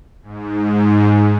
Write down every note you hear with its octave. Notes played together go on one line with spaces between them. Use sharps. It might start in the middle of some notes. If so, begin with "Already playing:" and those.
G#2